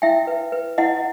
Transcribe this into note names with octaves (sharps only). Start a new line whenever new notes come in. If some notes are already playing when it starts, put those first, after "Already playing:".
E4 E5 G5
B4
B4
E4 D#5 F#5